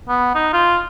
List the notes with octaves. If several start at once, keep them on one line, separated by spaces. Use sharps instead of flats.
B3
D#4
F4